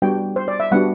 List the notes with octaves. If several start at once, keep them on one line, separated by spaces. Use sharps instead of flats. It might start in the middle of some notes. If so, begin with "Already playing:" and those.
G3 B3 D4 F#4 G5
C5
D5
E5
G3 B3 D4 F#4 F#5